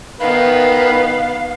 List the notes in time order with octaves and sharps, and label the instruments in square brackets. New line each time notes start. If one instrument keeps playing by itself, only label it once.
[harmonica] D#3 B4 [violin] B3 [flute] F5